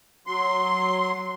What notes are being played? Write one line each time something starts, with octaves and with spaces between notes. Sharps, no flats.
F#3 C6